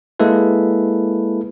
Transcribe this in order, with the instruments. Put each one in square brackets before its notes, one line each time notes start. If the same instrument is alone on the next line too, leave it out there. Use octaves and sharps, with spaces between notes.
[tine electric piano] G#3 A#3 E4 A4 B4